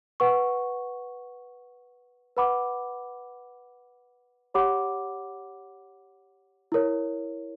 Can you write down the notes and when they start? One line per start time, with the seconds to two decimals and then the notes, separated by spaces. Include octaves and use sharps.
0.20 B4 F#5 C#6
2.37 B4 F#5 B5 D6
4.54 G4 C#5 F#5 B5 D6
6.72 E4 A#4 C#5